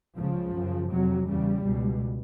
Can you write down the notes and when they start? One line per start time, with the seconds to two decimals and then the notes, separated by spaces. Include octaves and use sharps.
0.17 C#2 C#3 F3
0.55 F#2 C#3
0.91 F2 C3 F#3
1.28 E2 C#3 G3
1.65 C#2 B2